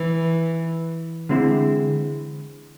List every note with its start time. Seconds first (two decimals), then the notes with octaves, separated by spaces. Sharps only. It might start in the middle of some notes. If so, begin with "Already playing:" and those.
Already playing: E3
1.29 D3 G#3 C4 E4